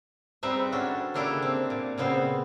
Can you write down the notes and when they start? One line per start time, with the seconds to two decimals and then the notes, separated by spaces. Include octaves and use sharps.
0.43 G3 G#3 C4 D#4 B4 E5
0.72 C#4 D4 F#4 A4
1.14 C#3 A#3 D4 E4 G4 A4
1.42 C4
1.70 A#2
1.98 A#2 C#3 B3 C4 C5